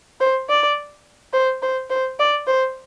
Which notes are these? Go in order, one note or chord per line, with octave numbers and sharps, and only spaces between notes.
C5
D5
C5
C5
C5
D5
C5